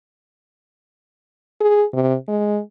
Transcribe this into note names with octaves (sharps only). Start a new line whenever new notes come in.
G#4
C3
G#3